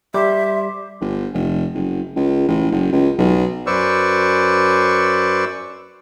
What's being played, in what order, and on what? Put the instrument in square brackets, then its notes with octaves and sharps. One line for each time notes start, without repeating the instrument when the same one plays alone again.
[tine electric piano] G3 [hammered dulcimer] C5 D6 [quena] E5
[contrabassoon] G1
F1
F#1
C#2
A1
F#1
C#2
B1
[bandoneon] F#2 B4 C5 D5 C#6 E6